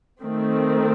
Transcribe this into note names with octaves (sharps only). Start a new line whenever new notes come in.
D#3 A3 C4